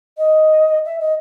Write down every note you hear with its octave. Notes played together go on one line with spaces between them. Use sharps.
D#5
E5
D#5